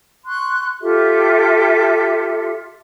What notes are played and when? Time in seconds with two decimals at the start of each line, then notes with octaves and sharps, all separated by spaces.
0.27 C6 C#6 F#6
0.81 F4 G4 A4 E5